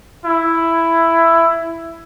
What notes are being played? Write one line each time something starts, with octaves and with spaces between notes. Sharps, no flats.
E4